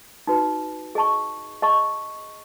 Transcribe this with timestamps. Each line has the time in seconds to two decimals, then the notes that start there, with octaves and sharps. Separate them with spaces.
0.27 D#4 F#4 B4
0.95 G#4 D#5 A5 C#6
1.62 G#4 D#5 A5 C#6